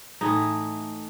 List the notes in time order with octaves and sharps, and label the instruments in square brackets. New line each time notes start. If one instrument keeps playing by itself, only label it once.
[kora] A2 E3 A3 D#4